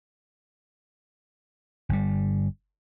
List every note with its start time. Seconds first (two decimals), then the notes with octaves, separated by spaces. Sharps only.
1.89 G1 G3